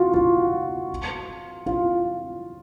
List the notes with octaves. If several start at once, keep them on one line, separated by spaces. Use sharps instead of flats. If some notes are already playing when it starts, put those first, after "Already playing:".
Already playing: F4 F#4
F4
F4